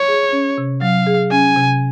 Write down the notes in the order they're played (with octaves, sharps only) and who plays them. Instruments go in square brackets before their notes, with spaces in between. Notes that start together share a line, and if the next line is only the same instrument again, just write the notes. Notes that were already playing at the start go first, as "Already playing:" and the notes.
Already playing: [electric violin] C#5
[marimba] G#4
C#4
C3
[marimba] F#3 [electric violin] F5
[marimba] G#4
[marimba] C#4 [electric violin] G#5
[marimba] C3